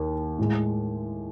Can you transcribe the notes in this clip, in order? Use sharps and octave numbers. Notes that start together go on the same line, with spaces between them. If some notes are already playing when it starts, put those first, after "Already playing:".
Already playing: D#2
A2 G#3